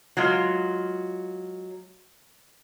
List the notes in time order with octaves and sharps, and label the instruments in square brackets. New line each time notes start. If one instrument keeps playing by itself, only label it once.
[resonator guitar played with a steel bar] F#3 G#3 F4